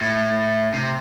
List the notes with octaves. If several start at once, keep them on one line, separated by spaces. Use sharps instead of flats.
A2
C3